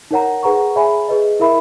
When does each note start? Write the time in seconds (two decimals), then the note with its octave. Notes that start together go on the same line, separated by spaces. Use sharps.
0.11 D#4 A#4 C#5 F#5 A#5
0.43 G#4 B4 F#5 A#5 C#6
0.76 G#4 C#5 E5 G#5 B5
1.08 G#4 B4 D#5
1.40 E4 A#4 E5 B5